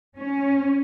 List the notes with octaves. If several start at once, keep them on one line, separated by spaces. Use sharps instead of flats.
C#4